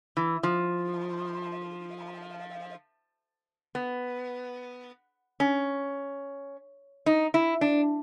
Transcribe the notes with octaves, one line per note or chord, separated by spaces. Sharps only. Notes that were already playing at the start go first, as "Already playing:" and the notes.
E3
F3
B3
C#4
D#4
E4
D4